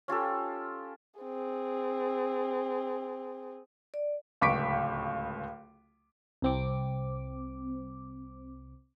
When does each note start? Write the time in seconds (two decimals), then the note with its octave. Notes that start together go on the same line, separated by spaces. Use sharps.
0.08 C#4 F4 G4 A4
1.20 C4 G#4
3.94 D5
4.41 D1 C#2 C#6 D6 B6 D7
6.42 C2 C4 D6